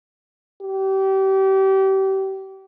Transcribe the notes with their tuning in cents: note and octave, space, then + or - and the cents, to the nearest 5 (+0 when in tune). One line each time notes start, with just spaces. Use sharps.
G4 -30